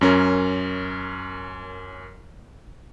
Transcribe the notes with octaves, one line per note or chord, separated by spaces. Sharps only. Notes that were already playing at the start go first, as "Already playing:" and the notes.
F#2 C#4 A#4